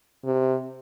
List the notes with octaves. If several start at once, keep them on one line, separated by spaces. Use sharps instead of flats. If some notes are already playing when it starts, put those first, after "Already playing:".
C3